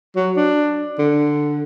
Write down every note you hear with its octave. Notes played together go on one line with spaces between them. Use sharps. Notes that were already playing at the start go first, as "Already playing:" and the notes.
F#3
D4
D3